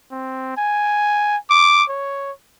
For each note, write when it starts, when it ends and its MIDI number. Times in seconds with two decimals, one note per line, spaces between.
0.12 0.56 60
0.57 1.37 80
1.50 1.84 86
1.90 2.32 73